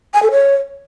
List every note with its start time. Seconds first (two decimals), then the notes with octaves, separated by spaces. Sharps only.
0.14 G#5
0.23 A4
0.31 C#5